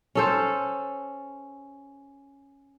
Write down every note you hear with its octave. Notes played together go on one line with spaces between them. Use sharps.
C#4 A4 C5